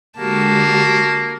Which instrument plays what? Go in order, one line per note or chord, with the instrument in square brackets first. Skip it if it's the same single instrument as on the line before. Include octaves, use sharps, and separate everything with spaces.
[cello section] D3 G#3 G4 [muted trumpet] A#3 [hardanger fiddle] F#4 A5